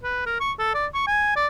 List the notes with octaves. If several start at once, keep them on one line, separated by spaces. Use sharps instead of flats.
B4
A#4
C#6
A4
D5
C#6
G#5
D5